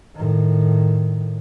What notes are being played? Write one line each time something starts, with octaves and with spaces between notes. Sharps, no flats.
A2 D#3